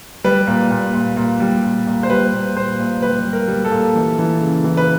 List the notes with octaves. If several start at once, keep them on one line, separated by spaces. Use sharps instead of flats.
G3 B4
A#2
A#2
A#2
A#2
G3
A#2
A#2
C5
G3 B4
A#2
A#2 C5
A#2
G3 B4
G3
A#4
G3
A4
A#2
E3
E3
C#3
E3
B4